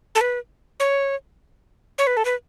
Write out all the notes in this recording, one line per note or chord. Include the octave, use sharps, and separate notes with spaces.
A4
B4
C#5
C#5
B4
A4
B4